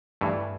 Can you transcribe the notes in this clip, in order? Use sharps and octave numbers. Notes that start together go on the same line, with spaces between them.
G2 E3 A3